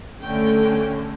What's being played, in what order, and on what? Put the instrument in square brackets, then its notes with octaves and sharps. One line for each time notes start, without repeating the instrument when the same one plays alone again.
[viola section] D3 A3 C#4 G5